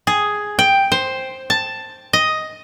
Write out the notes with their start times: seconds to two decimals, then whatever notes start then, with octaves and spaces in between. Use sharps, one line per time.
0.07 G#4
0.59 G5
0.92 C5
1.50 A5
2.13 D#5